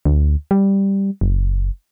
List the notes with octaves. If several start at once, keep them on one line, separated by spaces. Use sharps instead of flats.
D2
G3
F#1